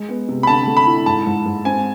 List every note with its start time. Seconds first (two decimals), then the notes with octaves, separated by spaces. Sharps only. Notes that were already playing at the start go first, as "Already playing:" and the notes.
Already playing: G#3
0.09 B3
0.28 C3
0.43 B5
0.47 D3 A5
0.67 A3
0.77 B5
0.86 E4
1.06 G#2 A5
1.26 G#2
1.46 G#2
1.65 C4 G#5